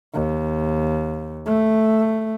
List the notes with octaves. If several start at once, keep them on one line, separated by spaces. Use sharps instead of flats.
D#2
A3